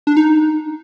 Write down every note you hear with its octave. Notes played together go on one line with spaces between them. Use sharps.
D4
D#4